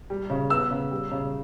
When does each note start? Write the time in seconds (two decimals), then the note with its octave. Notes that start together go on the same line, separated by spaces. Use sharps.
0.10 G3
0.30 C#3
0.50 B3 E6
0.71 C#3
0.91 G3
1.12 C#3